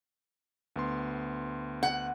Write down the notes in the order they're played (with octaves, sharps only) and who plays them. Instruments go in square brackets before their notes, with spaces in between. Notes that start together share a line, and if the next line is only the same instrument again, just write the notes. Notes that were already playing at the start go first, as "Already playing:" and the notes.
[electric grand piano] D2 B3 C6
[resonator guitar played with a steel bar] F#5